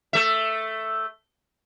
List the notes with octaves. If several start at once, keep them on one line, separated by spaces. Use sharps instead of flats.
A3 E5